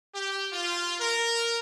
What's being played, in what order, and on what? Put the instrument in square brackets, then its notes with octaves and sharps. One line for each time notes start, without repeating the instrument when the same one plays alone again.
[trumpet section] G4
F4
A#4